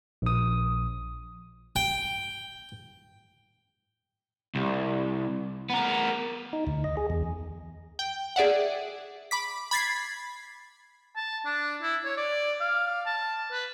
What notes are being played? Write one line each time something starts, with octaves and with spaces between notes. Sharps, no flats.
A#1 D#6
G5
C2
B3 A#4
D#4
D2
D#5
G#4
E2
G5
G#4 D5 E5 F#5
B5 D6 B6
B5 G#6 A6 B6 C7
A5
D4
E4
C#5
D5
F5
A5
B4